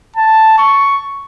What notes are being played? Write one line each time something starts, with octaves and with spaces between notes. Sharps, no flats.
A5
C#6